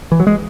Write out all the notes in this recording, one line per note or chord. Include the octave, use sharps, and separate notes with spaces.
E3
F#3
G#3